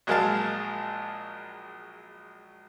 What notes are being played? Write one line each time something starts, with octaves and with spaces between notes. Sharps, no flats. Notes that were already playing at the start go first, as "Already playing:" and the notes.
A#1 F#3 G#3 A#4 F5 A5